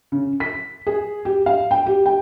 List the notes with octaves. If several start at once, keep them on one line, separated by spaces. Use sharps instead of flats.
C#3
B6
G#4
G4
F5
G5
G4
G5